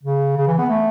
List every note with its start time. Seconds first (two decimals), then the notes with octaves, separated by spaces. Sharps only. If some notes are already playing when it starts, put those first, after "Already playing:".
0.03 C#3
0.36 C#3
0.47 E3
0.58 B3
0.69 A3